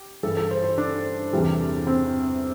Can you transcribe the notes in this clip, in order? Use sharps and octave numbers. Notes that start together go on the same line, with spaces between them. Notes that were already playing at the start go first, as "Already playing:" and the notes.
Already playing: G4
G2 E3 G3 A4
A4
C5
C5
D4
E2 C3 E3 G3
C4